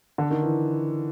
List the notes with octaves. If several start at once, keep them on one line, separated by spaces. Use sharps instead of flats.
D3
D#3
E3